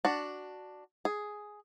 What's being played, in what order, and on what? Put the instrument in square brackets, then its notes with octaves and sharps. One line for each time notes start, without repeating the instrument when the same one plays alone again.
[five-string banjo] D4 F#4
G#4